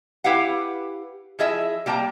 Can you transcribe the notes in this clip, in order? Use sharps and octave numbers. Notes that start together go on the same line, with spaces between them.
E4 G4 B4 F5 F#5
F3 E4 G#4 D#5 E5
G3 A#3 G4 A5 A#5